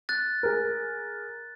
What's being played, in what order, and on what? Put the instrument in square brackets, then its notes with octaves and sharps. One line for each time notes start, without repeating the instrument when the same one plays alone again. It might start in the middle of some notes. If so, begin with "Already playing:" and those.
[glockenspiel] F#6 A6
[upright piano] G#4 A#4